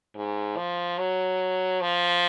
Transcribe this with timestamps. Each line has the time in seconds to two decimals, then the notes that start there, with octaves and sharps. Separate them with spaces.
0.16 G#2
0.57 F3
0.98 F#3
1.81 F3